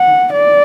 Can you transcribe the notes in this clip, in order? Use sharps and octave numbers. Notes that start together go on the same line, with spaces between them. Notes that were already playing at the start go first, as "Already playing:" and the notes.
Already playing: F#5
D5